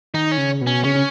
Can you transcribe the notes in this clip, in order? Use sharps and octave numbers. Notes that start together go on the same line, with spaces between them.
D#3 D#4
C#4
C#3
B2
C#4
C#3 C#4
C#3